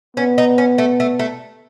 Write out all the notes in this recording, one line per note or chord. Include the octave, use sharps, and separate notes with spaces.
B3 C#4
D#4
C#4
A3
A3
A3